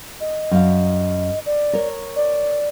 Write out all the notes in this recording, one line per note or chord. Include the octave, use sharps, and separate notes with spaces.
D#5
F#2 F5
D5
A#4 C#5
D5